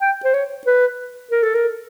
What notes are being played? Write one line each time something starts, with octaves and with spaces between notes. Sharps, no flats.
G5
C5
C#5
B4
A#4
A4
A#4